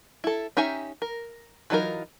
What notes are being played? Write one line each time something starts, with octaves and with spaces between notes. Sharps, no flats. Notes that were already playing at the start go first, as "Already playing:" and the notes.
E4 A4
C#4 D#4 G4 E5 G#5
A#4
E3 F#3 D#4 F4 A#4